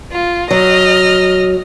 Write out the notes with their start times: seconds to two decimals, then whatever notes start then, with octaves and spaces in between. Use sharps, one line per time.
0.12 F4
0.51 F#3 D#5 F6